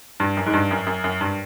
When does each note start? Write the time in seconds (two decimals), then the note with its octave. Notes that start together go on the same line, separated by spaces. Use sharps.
0.20 G2
0.37 F#2
0.46 G#2
0.53 G2
0.71 F#2
0.87 F#2
1.04 F#2
1.21 G2